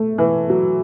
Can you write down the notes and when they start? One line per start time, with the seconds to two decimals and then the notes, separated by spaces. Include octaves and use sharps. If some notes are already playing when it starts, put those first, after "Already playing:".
Already playing: A3
0.18 E3
0.50 F#3